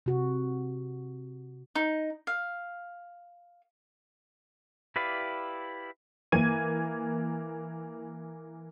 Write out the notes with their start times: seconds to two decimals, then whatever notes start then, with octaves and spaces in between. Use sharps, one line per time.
0.06 C3 F#4
1.75 D#4
2.27 F5
4.96 E4 G4 B4 D5 F5
6.32 E3 A#3 G#6 D#7